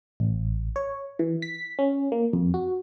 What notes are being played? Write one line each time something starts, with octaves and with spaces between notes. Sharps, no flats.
A1
C#5
E3
B6
C#4
A#3
F2
F#4